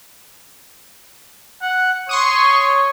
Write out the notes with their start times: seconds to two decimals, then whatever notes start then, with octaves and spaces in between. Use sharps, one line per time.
1.62 F#5
2.09 C#5 C6 C#6 D#6